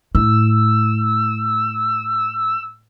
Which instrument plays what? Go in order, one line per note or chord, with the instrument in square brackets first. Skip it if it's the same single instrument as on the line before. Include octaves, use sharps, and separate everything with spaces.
[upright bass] A2 [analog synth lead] E6